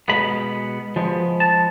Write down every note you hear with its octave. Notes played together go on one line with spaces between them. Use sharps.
B2 G#3 B3 B5
F3 G#3 B3
A5